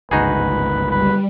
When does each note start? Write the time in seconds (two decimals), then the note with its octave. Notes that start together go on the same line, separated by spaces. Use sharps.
0.11 G1 C#2 G#2 D#4 F#4 G#4 B4
0.91 G3 B4